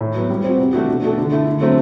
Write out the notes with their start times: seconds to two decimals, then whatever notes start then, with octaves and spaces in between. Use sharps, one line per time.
0.01 A2
0.15 F#3 B3
0.30 G3
0.44 C4 F#4
0.58 C3
0.73 E3 A3 D4 F#4
0.88 B2
1.03 A3 D4 F#4 A4
1.18 D3
1.32 A3 E4
1.47 D3
1.61 F#3 A3 C4